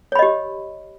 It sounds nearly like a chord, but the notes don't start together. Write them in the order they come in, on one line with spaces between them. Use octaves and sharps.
C#5 B5 D#5 G4